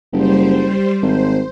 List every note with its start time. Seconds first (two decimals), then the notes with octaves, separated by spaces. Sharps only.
0.13 F#1 G3 C5
1.02 G#1 C5